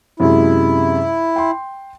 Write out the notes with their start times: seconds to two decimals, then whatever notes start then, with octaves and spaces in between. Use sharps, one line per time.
0.20 F#2 C3 G#3 E4
1.36 G5 C6